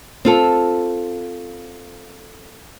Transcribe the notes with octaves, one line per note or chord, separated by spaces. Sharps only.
C4 F4 A4